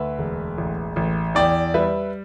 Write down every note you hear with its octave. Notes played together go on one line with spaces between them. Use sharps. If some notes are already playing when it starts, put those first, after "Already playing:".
Already playing: D2 B4 E5
E1
A1
A1
E2 D5 G5
G3 B4 E5